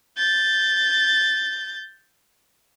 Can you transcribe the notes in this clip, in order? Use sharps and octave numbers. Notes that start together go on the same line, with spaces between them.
G6 A6